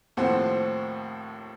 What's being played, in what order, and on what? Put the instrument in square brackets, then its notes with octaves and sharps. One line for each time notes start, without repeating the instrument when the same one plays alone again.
[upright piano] D#2 A2 F3 C4 C5 F#5